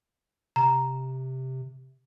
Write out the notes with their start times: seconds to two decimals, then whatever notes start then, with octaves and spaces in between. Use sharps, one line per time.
0.56 C3 A#5